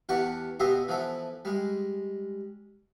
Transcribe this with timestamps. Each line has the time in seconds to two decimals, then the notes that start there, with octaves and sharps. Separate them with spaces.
0.09 E2 E3 G4 F#5 A5 C#6
0.60 B2 B3 F4 G4 D#5 E5
0.88 E3 F3 B3 A4 E5
1.45 G3 G#3